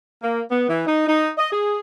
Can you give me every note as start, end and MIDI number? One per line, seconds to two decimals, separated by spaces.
0.21 0.41 58
0.50 0.67 59
0.69 0.83 52
0.87 1.03 63
1.07 1.29 63
1.38 1.50 75
1.52 1.80 68